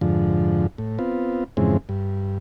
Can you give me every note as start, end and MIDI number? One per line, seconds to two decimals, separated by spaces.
0.01 0.67 41
0.01 0.67 44
0.01 0.67 50
0.01 0.67 53
0.78 0.98 45
0.99 1.44 59
0.99 1.44 60
0.99 1.44 65
1.57 1.77 41
1.57 1.77 44
1.57 1.77 49
1.57 1.77 52
1.57 1.77 56
1.57 1.77 60
1.89 2.38 43